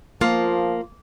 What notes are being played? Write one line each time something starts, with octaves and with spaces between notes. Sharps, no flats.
F3 A#3 F4